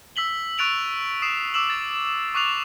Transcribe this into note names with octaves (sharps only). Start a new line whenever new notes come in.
E6 B6 F#7 G7
C#6 F#6 A6 D7 F7 F#7
D#6 C7 E7
D6 E6 E7 F#7
A6
C#6 D6 F#6 C7 F7